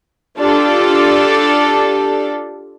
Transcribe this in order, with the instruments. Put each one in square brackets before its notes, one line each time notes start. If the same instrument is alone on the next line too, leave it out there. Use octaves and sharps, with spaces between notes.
[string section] D4 F4 G4 A4 D5